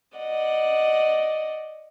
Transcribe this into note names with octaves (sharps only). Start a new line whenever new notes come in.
D5 D#5 F#5